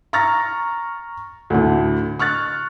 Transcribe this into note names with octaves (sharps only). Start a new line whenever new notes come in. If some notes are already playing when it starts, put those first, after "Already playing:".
A#5 C#6 F6 A6 A#6
D2 A2 D3
C#6 F6 F#6 A6